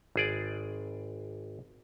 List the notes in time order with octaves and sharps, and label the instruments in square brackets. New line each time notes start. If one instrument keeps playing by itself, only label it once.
[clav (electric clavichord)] G#1 G#4 D5